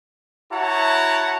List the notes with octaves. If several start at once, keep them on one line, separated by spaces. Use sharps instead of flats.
E4 F#4 C#5 F#5 A5 A#5